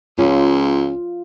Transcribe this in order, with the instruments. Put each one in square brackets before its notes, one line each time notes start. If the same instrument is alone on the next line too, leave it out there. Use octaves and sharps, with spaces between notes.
[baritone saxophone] C#2 [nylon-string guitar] C#4 [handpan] F4